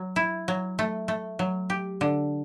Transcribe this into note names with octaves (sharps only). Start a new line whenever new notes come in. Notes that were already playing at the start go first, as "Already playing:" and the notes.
Already playing: F#3
E4
F#3
A3
A3
F#3
G4
D3